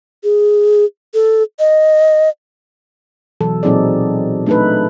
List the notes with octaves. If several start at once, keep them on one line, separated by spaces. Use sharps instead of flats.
G#4
A4
D#5
B2 E3 F#3 A4
A#2 F#3 C4 D#4 G#4 D5
A3 D4 D#4 A4 B4